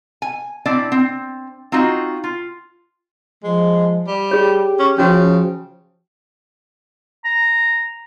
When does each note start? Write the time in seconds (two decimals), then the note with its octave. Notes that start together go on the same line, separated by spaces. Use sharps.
0.22 G#5
0.66 C4 D4 E4 D5
0.92 C4
1.72 C4 D#4 F4 F#4
2.24 F4
3.44 F3 G#3
4.07 G3
4.31 G4 G#4 C#5
4.79 C#4
4.98 C#3 F3 C#4 F#4 C#5
7.25 A#5